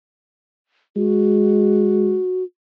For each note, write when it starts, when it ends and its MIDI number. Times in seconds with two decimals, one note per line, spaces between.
0.97 2.17 56
0.97 2.43 66